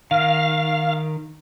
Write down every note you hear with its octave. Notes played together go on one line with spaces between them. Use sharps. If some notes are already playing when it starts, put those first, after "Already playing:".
D#3 F5